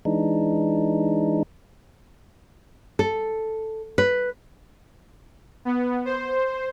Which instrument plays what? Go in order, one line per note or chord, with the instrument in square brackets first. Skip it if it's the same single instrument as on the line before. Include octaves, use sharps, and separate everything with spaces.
[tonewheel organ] E3 G#3 D4 D#4
[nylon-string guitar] A4
B4
[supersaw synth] B3
C5